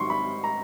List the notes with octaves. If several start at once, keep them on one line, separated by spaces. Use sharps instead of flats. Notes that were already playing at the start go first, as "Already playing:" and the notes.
Already playing: G#2 D#3 F#3 C6 C#6
B5
A#5